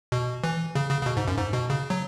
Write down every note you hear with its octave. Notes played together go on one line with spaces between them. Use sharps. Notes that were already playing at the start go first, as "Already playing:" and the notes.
B2
E3
C#3
C#3
C#3
B2
G#2
F#2
G#2
B2
C#3
F#3